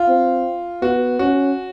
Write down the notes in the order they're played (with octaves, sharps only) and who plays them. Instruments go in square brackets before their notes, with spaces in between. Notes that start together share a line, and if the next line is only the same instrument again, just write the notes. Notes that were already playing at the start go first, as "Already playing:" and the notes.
Already playing: [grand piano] F4
[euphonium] C4
[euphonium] B3 [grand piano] F#4
[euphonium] C#4 [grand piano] F#4